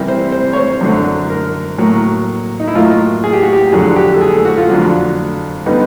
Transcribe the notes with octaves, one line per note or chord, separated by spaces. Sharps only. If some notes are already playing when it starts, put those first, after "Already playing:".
Already playing: C3 E3 G3 A#4
C5
C5
C#5
C5
F#2 D3 F#3
A#4
A2 F#3 A#3
D#4
E4
A2 F#3 A#3 F4
G#4
G4
F#4
G4
F2 D3 F#3 G#4
G4
A4
G#4
A4
F#4
F4
F2 D3 F#3
D3 G3 B3 D#4